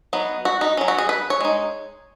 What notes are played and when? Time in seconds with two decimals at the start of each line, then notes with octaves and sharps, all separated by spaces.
0.13 F#3 B3 D#4
0.45 F#4
0.61 D#4
0.77 F#3 C#4
0.88 F#4
0.98 G#4
1.09 B4
1.30 C#5
1.41 G#3 D#4